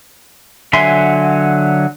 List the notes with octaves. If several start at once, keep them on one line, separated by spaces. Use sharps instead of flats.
D3 F#3 E5 G#5 C6